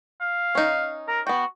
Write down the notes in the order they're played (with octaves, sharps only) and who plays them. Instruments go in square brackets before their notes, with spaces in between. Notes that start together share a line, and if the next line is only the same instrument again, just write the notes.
[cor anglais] F5
[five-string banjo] C#4 D#4
[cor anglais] A#4
[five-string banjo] B3 G5 [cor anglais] F#4